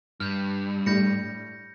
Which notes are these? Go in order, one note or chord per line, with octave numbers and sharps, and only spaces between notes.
G2 F6 G6
A2 G3 D4 G6 A#6 C#7